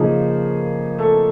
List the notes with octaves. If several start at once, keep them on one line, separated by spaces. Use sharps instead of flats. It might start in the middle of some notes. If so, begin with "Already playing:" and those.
Already playing: C#3 F3 A#3 D#4 G#4
A3 A4